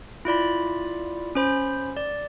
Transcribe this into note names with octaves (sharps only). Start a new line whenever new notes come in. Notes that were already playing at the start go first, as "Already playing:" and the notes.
E4 F4 D5 B5
C#4 C5 B5
D5